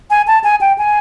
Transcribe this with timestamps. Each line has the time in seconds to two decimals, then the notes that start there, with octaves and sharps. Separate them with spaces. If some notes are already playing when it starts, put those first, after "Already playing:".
0.10 G#5
0.27 A5
0.44 G#5
0.61 G5
0.78 G#5